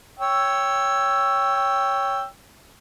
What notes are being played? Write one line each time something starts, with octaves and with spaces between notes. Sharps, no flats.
C#5 G5 E6